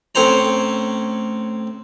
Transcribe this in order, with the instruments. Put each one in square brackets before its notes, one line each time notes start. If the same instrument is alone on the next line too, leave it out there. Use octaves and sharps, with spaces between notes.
[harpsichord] A2 C4 C#4 C5 A#5